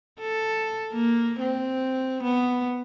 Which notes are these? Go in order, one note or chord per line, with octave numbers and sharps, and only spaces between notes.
A4
A#3
C4
B3